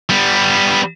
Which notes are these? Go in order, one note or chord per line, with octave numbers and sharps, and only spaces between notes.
G3 B3